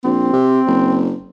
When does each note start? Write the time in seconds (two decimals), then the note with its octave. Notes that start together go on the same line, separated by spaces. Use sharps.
0.04 A#1 C4
0.33 C3
0.67 F#1